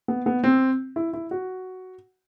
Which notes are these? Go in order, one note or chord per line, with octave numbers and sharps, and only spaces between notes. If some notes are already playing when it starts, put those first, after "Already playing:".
B3
B3
C4
E4
E4
F#4